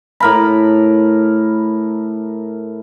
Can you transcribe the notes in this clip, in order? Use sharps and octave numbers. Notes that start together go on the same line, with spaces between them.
A2 A#4 B5